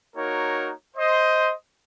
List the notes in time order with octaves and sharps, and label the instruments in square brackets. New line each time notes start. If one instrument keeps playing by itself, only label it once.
[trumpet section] A#3 D#4 F#4 A#4 C#5
C5 D#5